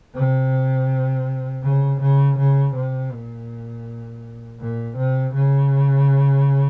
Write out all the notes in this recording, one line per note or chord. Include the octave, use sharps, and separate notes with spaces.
C3
C#3
C#3
C#3
C3
A#2
A#2
C3
C#3